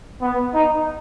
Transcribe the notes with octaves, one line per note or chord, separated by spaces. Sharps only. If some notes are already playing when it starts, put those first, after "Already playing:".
B3
D#4